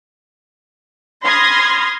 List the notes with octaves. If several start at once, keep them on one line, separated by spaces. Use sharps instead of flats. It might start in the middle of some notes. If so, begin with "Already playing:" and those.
B5 C6 D#6 F6 G#6 A#6